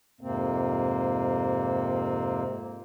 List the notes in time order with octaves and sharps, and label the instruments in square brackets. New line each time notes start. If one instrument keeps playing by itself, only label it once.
[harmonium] F2 G#2 C3 A#3 C4